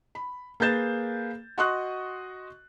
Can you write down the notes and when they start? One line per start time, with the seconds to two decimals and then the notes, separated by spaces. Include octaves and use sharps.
0.15 B5
0.60 A#3 G#4 B4 G6 A6 E7
1.58 F#4 D#5 C6 C#6 D#6 F#6